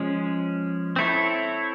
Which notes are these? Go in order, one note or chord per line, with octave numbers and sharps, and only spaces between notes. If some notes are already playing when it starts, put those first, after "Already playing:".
Already playing: F3 G#3 C#4
C4 E4 A4 C#5